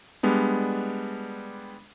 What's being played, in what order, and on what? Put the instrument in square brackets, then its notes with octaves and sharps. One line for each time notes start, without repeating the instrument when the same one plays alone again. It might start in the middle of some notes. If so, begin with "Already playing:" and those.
[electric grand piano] G3 G#3 B3 D4